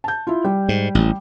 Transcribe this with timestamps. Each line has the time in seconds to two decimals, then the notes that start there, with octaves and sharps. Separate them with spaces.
0.04 A5 G6
0.27 E4 F4
0.44 G3
0.69 G#2
0.95 A1